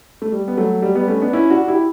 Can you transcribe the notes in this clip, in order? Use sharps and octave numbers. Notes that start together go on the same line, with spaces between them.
A3
G3
B3
F#3 A3
G3
G3 B3
A3 C#4
B3 D4
C#4 E4
D4 F#4
E4 G4